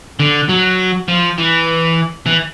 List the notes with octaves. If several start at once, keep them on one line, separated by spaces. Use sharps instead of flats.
D3
F#3
F3
E3
E3